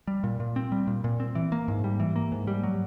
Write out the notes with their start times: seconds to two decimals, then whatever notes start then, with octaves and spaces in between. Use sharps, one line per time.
0.08 G3
0.24 A#2
0.40 A#2
0.56 C4
0.72 G3
0.87 A#2
1.04 A#2
1.20 C4
1.35 E3
1.52 A#3
1.68 G#2
1.84 G3
2.00 E3
2.16 A#3
2.32 G#2
2.47 G3
2.63 F#3